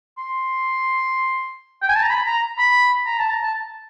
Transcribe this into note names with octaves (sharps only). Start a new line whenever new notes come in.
C6
G5
G#5
A5
A#5
B5
A#5
B5
A#5
A5
A#5
A5